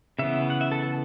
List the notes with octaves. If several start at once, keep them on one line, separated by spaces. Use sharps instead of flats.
C#3 E3 B3 E5
F#5
E5
A4
A4